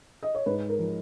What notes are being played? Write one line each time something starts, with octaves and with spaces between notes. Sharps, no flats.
D#5
C#5
G#2 B4
A#4
F3